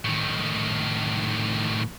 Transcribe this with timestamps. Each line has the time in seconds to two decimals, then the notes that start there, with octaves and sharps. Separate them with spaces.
0.05 A2 D#3